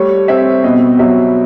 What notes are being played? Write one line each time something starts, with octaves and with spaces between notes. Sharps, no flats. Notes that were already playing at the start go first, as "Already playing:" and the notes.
Already playing: G3 A3 C#5
C4 E5
B2 D#5
F#3 E5